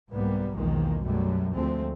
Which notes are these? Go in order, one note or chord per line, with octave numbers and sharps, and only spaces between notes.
C2 G#2 G3 A#3 B3
B1 E2 D#3 F3 G#3 A#3
F#2 B2 F#3 G3 A3
D2 F3 G#3 A3 C4